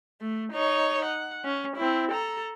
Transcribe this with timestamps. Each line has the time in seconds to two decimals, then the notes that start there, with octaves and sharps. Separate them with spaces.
0.21 A3
0.53 D#4 C#5
1.05 F#5
1.45 C#4
1.76 C4 E4
2.11 A4 A#5